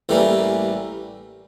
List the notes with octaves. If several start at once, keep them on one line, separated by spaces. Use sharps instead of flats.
A1 A2 E3 G3 A#3